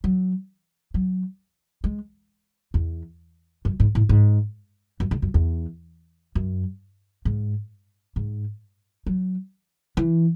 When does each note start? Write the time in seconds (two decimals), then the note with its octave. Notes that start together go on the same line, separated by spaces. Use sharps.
0.04 F#3
0.94 F#3
1.84 G#3
2.74 E2
3.65 F#2
3.80 G#2
3.95 A2
4.09 G#2
5.00 F#2
5.11 G#2
5.22 F#2
5.34 E2
6.35 F#2
7.25 G#2
8.16 G#2
9.06 F#3
9.97 E3